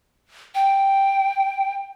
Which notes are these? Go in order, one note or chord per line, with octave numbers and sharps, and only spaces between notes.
G5